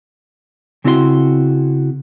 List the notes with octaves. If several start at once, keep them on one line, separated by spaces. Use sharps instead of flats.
C#3 C4 E4 F#4 D5 C6